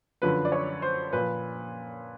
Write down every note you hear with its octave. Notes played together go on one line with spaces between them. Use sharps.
F#2 D3 F3 B4
D5
C#5
C5
A#2 F3 B4